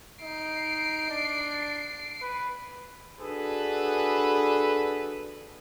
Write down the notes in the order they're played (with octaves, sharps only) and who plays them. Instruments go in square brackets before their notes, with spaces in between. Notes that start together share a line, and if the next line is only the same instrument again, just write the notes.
[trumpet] D#4 [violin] C7 D7
[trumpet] D4
B4
[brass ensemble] D4 F#4 G#4 A4 B4